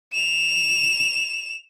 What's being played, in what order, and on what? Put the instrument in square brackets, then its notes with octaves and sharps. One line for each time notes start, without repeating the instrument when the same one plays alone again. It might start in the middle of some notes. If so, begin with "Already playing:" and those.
[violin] E7 F7